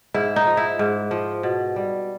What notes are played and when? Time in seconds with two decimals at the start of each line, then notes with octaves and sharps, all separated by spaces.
0.14 G#2 E4
0.36 D#4
0.47 F3
0.57 E4
0.79 G#2
1.11 F3
1.43 B2
1.76 G3